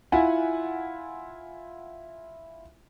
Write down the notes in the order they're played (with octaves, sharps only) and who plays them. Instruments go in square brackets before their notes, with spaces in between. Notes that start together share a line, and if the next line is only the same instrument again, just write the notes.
[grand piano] E4 F4 F#5 G#5